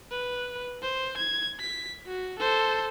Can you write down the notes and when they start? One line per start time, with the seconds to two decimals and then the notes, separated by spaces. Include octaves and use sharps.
0.11 B4
0.82 C5
1.17 G#6
1.60 B6
2.07 F#4
2.39 A4 C5